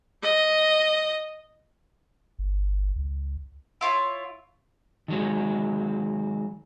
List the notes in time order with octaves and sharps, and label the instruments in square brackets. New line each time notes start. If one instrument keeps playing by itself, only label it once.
[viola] D#5
[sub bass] G1
C#2
[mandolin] E4 F4 C#5
[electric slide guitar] D#3 F#3 G#3